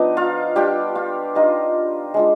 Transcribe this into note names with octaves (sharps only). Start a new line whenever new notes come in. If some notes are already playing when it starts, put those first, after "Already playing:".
Already playing: F3 B3 D4 D#4 D#5
F4 F5
G3 D4 F4 G4 G5
F4 F5
G3 D4 D#4 F4 D#5
G#3 D4 F4